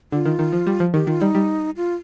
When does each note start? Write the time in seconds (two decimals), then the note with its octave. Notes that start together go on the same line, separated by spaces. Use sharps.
0.12 D3 F4
0.25 D#3
0.39 D#3
0.53 F3
0.67 G3
0.80 F3
0.94 D#3 G4
1.07 D#3 F4
1.21 G3 D#4
1.35 G3
1.76 F4